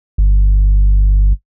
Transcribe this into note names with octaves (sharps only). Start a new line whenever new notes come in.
G1